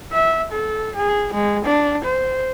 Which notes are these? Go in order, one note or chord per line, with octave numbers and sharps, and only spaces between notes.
E5
A4
G#4
G#3
D4
C5